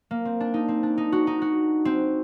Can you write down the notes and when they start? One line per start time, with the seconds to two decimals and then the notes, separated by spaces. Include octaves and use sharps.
0.11 A#3
0.25 C4
0.40 D4
0.54 D#4
0.68 C4
0.83 D4
0.98 D#4
1.12 F#4
1.27 D#4
1.42 F#4
1.85 C4